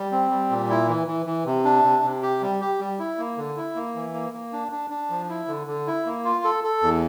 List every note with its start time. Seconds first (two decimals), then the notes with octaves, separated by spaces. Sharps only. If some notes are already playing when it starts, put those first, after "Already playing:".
Already playing: G3
0.12 C4
0.31 G3
0.50 A#2
0.69 E4
0.88 E3
1.07 E3
1.26 E3
1.45 C3
1.65 D4
1.84 C3
2.03 C3
2.23 G4
2.42 G3
2.61 G4
2.80 G3
2.99 E4
3.18 A#3
3.37 D3
3.57 E4
3.75 A#3
3.95 E3
4.14 A#3
4.33 A#3
4.53 D4
4.72 D4
4.90 D4
5.10 F3
5.29 E4
5.48 D3
5.67 D3
5.87 E4
6.05 A#3
6.25 F4
6.44 A4
6.64 A4
6.82 E2